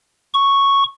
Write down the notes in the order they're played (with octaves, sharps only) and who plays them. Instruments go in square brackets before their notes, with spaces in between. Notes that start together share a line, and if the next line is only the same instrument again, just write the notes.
[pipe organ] C#6